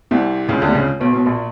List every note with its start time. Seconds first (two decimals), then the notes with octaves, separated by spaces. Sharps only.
0.11 C2 C3
0.49 C#2 C#3
0.62 D2 D3
0.68 C3
0.75 C#2 C#3
1.00 B1 B2
1.13 B1 B2
1.26 A#1 A#2